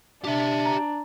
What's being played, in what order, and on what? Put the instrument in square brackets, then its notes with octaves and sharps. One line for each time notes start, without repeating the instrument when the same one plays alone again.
[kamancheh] D4 [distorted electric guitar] G4 E5
[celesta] A#5